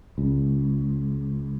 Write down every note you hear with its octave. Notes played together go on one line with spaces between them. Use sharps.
C#2